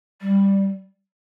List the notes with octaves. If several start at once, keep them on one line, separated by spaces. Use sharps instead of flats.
G3